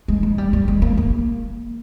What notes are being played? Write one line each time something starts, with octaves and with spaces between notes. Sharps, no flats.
G#3
G#3
G3
G3
G#3
A#3
A#3